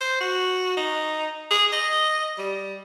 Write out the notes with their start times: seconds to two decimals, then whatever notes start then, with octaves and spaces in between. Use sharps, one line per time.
0.01 C5
0.20 F#4
0.77 D#4
1.51 G#4
1.72 D#5
2.38 G3